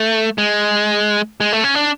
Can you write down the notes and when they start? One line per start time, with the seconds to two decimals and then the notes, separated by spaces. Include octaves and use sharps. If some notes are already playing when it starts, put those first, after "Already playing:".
Already playing: A3
0.38 G#3
1.41 G#3
1.53 A3
1.64 C#4
1.75 D4